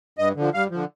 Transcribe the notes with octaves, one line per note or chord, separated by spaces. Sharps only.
G2 D#5
D3 F3
G2 F5
D3 F3